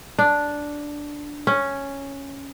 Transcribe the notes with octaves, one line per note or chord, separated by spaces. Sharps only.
D4
C#4